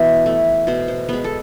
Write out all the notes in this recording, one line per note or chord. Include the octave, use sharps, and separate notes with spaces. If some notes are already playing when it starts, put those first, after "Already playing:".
Already playing: B2 E3 B3
A3
B2 C5
C5
G#3 B3 B4
A4